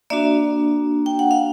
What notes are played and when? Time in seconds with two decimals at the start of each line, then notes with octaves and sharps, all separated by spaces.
0.10 A#3 D4 F#4 D5 E5
1.06 G5
1.19 F#5
1.31 F5